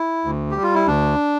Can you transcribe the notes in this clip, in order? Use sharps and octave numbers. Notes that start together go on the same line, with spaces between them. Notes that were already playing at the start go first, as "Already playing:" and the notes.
Already playing: E4
D2
G3 G4
F4
E4
D2 D4